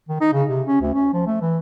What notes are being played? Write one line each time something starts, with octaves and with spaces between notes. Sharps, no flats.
D#3
D#4
C#3
C3
C#4
D2
C#4
F3
A3
E3